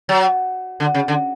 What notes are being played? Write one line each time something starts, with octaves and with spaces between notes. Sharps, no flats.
F#3
D3
C#3
D3